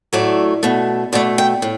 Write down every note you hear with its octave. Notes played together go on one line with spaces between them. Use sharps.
A2 F#3 A3 D5
B2 A3
B2 A3 D5
G5
A2